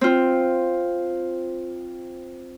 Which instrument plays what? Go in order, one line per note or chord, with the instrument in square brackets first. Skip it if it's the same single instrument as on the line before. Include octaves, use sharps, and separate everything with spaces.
[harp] C4 F4